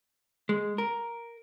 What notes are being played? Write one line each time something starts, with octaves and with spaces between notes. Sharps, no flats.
G#3
A#4